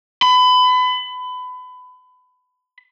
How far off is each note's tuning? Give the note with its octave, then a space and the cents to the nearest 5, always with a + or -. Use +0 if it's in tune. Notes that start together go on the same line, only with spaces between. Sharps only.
B5 +30